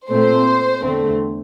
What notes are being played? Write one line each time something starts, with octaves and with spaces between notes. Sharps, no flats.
A#2 A3 C4 C5
E2 D3 A3 C4